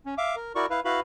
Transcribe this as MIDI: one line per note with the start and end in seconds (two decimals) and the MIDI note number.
0.06 0.15 61
0.18 0.36 76
0.18 0.36 77
0.18 0.36 86
0.36 0.53 70
0.55 0.66 64
0.55 0.66 66
0.55 0.66 70
0.55 0.66 74
0.55 0.66 85
0.70 0.80 64
0.70 0.80 71
0.70 0.80 77
0.85 1.00 64
0.85 1.00 66
0.85 1.00 71
0.85 1.00 77
0.85 1.00 83